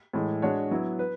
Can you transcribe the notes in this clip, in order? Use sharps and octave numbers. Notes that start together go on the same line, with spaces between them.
A2 E3 G#3
G#3 D4 F#4 C#5
F#3 B3 E4
B4